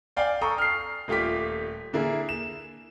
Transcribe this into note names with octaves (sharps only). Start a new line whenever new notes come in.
D5 F5 G5 G#5
A4 G5 A#5 C#6 D#6
F6 C7
D#1 A3 F4 G4 D6 B6
D3 A#3 E4 G#4
E7